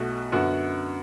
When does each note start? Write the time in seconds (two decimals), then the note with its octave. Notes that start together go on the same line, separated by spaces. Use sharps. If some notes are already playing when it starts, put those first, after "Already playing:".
Already playing: B1 B2 A3 F#4
0.32 F#2 D3 B3 F#4